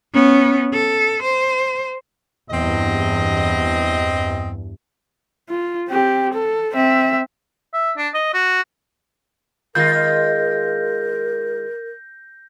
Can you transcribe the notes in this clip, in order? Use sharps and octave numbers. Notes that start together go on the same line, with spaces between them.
B3 C#4
A4
C5
E2 G2 C4 D#5
F4
C4 G4
A4
C4 E5
E5
D4
D#5
F#4
D#3 G#3 F4 A#4 G6 A#6